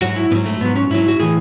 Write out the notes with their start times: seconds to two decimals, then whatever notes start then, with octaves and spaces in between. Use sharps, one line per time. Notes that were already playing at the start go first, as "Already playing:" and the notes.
0.02 G#2 F#3 F#4
0.16 E4
0.31 G#2 B3
0.35 F#3
0.46 A3
0.61 G#2 F#3 B3
0.76 C#4
0.90 G#2 F#3 E4
1.08 F#4
1.20 A2 E3 G#4